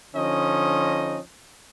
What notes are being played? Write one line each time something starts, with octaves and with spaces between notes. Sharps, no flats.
D3 F3 C#4 D#4 D#5